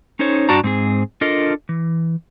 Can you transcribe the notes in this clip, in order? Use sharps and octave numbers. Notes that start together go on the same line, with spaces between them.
C#4 D#4 A4 C5 C#5
G2 D4 F#4 A5 A#5
G#2 C4 G#4
D4 F4 A4 A#4 D#5
E3